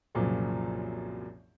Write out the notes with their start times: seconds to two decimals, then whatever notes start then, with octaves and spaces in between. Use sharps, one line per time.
0.15 C2 F#2 A#2 C#3 F3 F#3